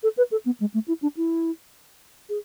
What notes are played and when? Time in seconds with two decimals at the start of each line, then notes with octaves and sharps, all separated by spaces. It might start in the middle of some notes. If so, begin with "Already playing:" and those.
0.03 A4
0.17 B4
0.31 A4
0.45 B3
0.60 G#3
0.74 A3
0.88 E4
1.02 D4
1.17 E4
2.29 G#4